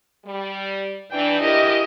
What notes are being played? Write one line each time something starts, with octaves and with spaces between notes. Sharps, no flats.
G3
E3 D4 G5
G#2 E4 G4 A#4 D#5